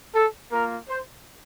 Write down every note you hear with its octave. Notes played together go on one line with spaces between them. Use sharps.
A4
A#3 F4 A#4
C5